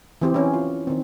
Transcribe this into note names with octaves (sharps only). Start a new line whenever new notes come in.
E3 C4 G4
C#4 E4
F4
D#3 C4